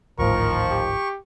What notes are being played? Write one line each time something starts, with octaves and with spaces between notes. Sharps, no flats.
D1 G#1 A2 D#3 F3 A#4 C#6
G4